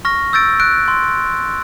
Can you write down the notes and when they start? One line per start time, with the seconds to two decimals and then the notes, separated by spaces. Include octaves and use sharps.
0.05 C#6 F6 A#6
0.33 E6 G6 A6 D7
0.60 F#6 D7
0.88 C6